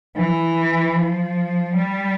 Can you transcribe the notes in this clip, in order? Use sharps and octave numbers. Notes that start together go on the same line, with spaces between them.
E3
F3
G3